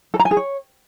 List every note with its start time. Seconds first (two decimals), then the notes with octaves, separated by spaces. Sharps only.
0.14 A4
0.19 A#5
0.25 G#5
0.31 G#4
0.37 C#5